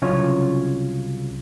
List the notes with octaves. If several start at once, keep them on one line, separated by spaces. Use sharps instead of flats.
C2 C#3 F#3 C#4 F4 C#5